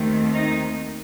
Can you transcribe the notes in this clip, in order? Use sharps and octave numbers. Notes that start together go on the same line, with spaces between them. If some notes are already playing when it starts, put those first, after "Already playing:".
Already playing: D#2 D#3 A3 C4
D#4